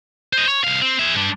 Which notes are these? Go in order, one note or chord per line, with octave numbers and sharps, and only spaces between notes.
C5 D#5
C#5
C2 F5
C4
G#4 E5
G2 D4